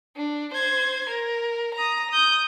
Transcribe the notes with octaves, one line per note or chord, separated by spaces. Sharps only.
D4
C5 G#6
A#4
A#5 D#6
D#6 G6